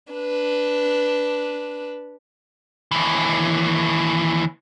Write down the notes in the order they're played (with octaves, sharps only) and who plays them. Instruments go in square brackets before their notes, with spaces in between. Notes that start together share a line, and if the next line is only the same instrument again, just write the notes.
[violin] D4 B4
[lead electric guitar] D#2 E3